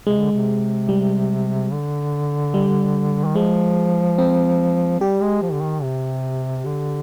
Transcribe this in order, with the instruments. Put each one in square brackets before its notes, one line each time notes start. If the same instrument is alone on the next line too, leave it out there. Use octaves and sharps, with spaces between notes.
[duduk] C3 [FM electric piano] G#3
[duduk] D3
C3
[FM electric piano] G3
[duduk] D3
[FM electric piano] G3
[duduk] D#3
[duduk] F3 [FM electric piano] G#3
[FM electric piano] C4
[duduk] G3 [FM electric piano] G4
[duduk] G#3
F3
D3
D#3
C3
D3